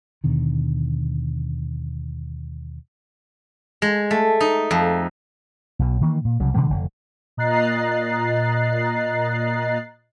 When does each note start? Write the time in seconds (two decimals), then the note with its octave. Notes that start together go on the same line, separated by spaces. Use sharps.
0.24 D#2 B2 D3 D#3
3.82 G#3
4.11 A3
4.40 D#4
4.71 F2
5.79 B1 B2
6.01 D#3 E3 A#3
6.25 A#2
6.40 C2 C#3 F#3
6.54 B2 D3 E3 G#3
6.70 F1 B2 D3
7.37 A#2 D#5 A#5 F#6 A6 C7